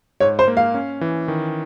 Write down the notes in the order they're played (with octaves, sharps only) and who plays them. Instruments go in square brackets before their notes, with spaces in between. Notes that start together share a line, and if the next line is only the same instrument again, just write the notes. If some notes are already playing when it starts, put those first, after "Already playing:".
[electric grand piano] G#2 [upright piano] C#5
[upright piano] C5
[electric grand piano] A#3
[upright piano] F5
[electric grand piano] C#4
E3
D#3